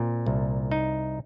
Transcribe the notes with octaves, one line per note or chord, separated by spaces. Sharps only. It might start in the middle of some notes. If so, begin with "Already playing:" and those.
Already playing: A#2 C4
C2
D#4